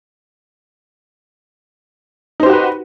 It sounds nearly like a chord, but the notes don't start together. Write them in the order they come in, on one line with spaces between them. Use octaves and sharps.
D#4 C5 G4 F#4 B4